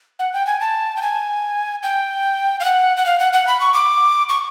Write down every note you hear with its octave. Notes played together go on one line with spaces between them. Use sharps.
F#5
G5
G#5
A5
G5
G#5
G5
F5
F#5
F#5
F5
F#5
F#5
B5
C#6
D6
C#6